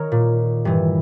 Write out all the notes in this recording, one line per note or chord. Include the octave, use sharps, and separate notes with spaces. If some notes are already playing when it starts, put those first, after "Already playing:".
Already playing: D#3 A#4 C#5
A#2
G2 E3